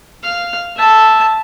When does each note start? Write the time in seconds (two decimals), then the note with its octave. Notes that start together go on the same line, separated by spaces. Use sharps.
0.23 F5
0.76 E5 A5